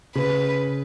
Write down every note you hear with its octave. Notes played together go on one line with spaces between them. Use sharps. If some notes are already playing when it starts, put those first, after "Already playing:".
C#3 B4